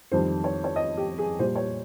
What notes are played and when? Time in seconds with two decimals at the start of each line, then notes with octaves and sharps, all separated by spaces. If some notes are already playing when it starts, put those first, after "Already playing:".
0.12 F2 D#3 G3 C5
0.44 C#5
0.64 C#5
0.76 D#5
0.97 G4
1.18 G#4
1.39 A#2 G3 C5
1.56 C#5